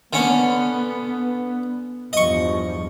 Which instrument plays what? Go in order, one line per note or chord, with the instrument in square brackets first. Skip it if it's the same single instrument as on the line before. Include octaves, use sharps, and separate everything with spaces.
[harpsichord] D3 C#4 [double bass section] B3
[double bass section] E2 G2 F3 [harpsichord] D#5 C#6